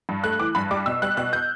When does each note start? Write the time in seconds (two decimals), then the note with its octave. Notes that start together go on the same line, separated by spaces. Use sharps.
0.09 G2
0.24 A3 F#6
0.40 E3 D6
0.55 G2 B5
0.71 G3 D6
0.86 B2 E6
1.02 G3 F#6
1.17 B2 F#6
1.33 G6